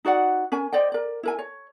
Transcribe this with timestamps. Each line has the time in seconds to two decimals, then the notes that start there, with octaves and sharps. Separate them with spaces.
0.05 D#4 F#4 D5 F#5
0.52 C#4 A#4 G#5
0.73 C5 D5 D#5 G5
0.92 A#4 D5
1.23 E4 A#4 G#5
1.39 C#5